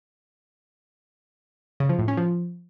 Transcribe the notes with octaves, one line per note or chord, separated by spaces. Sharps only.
C#3
F3
A2
C#4
F3